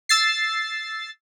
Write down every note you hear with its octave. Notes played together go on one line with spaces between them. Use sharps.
E6 A6 C7